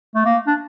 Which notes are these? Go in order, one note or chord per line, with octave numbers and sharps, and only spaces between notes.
A3
A#3
D4